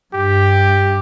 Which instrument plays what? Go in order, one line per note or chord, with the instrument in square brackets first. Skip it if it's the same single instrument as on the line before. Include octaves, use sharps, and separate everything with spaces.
[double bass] G2 [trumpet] G4